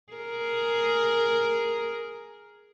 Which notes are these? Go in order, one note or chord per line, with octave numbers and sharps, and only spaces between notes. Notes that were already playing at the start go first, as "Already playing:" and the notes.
G#4 A#4